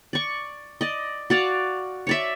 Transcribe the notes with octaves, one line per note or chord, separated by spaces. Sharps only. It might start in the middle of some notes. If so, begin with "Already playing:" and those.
D5 C#6
D5 D#5
F#4 D5 F5
C#5 D5 E5